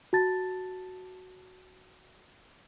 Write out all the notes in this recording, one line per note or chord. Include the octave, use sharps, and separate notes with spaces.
F#4 A5 A6